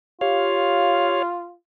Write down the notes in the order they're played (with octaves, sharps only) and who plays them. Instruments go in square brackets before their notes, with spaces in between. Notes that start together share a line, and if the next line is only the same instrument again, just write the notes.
[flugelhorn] F4 [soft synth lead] G4 [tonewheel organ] C#5 F5